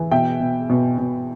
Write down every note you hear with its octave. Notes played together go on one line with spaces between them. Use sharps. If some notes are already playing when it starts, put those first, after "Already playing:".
Already playing: E3
B2 E5 G5
B2
B2
B2